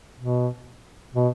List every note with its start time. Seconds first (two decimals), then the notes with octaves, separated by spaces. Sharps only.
0.20 B2
1.14 B2